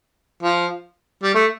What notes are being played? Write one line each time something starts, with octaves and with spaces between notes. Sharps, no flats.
F3
G3
A3